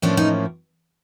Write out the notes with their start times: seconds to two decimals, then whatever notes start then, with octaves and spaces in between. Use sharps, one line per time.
0.02 A2 F3 A#3 C#4 D4
0.17 D#4